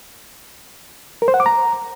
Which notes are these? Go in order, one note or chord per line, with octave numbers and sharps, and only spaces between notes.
A#4
C5
F#5
D6
A#5